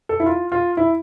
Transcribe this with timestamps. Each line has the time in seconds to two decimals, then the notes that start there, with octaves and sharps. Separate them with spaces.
0.09 A4
0.20 E4
0.26 F4
0.52 F4
0.77 E4